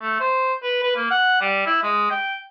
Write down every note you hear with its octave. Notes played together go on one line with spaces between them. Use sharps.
A3
C5
B4
B4
A#3
F#5
G3
E4
G#3
G5